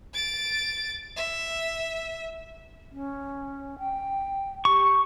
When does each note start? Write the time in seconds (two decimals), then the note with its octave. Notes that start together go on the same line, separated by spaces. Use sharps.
0.14 A6 D7
1.16 E5
2.92 C#4
3.79 G5
4.65 G4 C#6